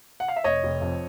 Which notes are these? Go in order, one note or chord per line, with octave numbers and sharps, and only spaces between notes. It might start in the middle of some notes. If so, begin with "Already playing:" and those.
F#5
F5
E5
F1 C#5 D#5
F1
F2